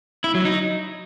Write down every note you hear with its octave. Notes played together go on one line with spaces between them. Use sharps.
E4
F#3
D#4